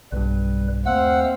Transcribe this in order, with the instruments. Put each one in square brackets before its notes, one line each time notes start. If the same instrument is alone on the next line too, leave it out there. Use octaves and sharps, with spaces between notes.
[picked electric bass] B1 G2 [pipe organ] G3 B4
[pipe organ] D#2 A3 E6 [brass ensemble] C4 C5 F5 [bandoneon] F#5